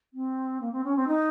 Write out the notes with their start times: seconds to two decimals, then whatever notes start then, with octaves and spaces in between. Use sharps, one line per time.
0.14 C4
0.61 A#3
0.72 C4
0.84 C#4
0.96 C4
1.08 D#4